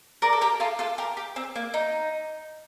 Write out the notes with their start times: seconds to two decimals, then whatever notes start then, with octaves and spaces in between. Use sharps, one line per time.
0.22 A#4 D5
0.33 A4
0.41 G4 A#4
0.60 F4 A4
0.79 F4 A4
0.98 G4 A#4
1.17 G4
1.36 C4
1.56 A#3
1.74 D#4